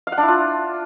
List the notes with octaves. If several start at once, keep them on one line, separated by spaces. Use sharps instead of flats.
F5
F#5
D4
E4
F4